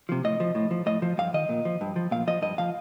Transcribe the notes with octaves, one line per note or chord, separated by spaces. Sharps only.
C3 F3
A2 D#5
F3
A2
F3
A2 D#5
F3
G2 F5
D#3 D#5
A#2
F3
G2
F3
A#2 F5
F3 D#5
G2 D#5
F3 F5